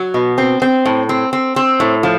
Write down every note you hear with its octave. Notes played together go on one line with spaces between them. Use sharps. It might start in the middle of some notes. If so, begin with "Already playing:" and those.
Already playing: F#3
B2
C4
C4
A2
C4
C4
C4
A2
F3